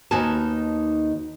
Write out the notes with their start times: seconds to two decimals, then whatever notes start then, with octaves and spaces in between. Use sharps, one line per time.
0.11 D#2 B3 D#4 F#4 G#5 A5